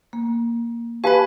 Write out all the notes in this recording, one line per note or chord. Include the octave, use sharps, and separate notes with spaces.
A#3
G4 B4 F5 G#5 A5 B5